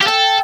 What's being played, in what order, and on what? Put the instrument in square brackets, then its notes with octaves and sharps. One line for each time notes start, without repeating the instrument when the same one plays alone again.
[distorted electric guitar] G4 [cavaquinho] F5
[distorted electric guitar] A4 [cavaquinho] G5